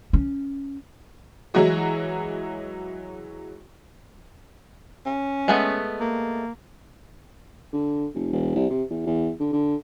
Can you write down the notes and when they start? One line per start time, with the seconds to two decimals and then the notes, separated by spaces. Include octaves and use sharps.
0.13 C#4
1.54 E3 F#3 G#3 E4 F#4 G#4
5.06 C#4
5.48 G#3 A3 B3
6.00 A#3
7.73 D3
8.15 F1
8.33 E1
8.56 C2
8.70 C3
8.90 E2
9.06 E2
9.40 D3
9.52 D3